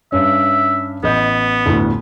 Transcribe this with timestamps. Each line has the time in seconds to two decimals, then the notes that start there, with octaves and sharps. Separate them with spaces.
0.12 G2 C#4 E5
1.03 A1 B3 D#5 G6
1.66 G1 D2 A2